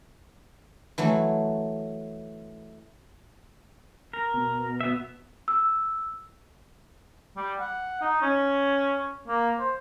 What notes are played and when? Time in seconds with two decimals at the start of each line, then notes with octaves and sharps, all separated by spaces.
0.98 E3 F#3 A3
4.13 A#4
4.34 B2
4.81 B3 E5
5.48 E6
7.37 G3
7.60 F#5
8.02 D#4
8.22 C#4
9.27 A#3
9.60 C5